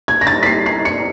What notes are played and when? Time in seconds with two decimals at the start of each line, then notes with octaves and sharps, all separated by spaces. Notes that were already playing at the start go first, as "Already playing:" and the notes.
0.08 G#6
0.21 A#6
0.27 A6
0.43 B6
0.46 C7
0.66 C7
0.85 C#7